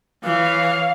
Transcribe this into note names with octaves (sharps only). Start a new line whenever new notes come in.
E3 C#5 F5